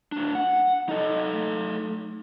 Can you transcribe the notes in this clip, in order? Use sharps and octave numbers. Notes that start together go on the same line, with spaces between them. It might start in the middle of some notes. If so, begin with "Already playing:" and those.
A2 D4
F#5
D#4 A4 D#5
A3